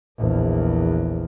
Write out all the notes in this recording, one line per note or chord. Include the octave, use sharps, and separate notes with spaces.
A#1 E2